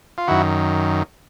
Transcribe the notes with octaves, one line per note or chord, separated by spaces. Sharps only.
F4
F#2 D#3 E4 F#4